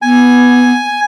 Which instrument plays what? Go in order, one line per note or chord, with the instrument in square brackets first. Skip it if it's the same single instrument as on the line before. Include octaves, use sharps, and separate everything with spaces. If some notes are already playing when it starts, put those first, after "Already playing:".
[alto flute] B3 [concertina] G#5